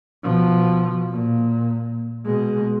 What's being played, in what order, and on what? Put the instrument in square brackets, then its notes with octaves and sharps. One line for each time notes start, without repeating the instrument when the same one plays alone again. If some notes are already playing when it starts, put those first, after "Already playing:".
[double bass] B2 F3
A#2
B2 G#3